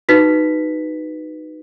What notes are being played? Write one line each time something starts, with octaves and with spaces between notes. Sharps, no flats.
D#4 F#4 B4 B6